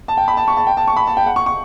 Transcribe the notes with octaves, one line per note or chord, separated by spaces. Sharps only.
A5
G5
B5
A5
C#6
A5
G5
A5
C#6
B5
A5
G5
F#5
C#6
C#6